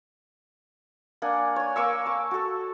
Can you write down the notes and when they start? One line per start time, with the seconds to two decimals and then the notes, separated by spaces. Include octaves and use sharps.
1.22 A#3 D4 F#5 G#5
1.56 C#5 G#5
1.76 A#3 C#6 E6
2.06 A5 C#6
2.31 F#4 A4